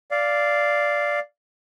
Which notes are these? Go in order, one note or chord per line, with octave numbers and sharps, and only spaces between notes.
D5 F5